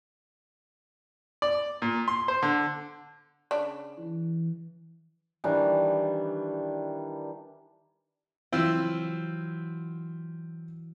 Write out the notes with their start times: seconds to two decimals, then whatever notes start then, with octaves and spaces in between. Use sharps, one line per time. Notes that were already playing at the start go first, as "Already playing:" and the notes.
1.42 D5
1.82 A#2
2.08 C6
2.28 C5
2.42 D3
3.51 C#3 D4
3.97 E3
5.44 D#3 E3 G3 D4
8.52 E3 F#3 C4 E4 F4